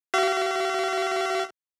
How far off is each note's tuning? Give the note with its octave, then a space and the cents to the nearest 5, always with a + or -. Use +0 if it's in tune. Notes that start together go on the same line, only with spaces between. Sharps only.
F#4 +45 F5 -40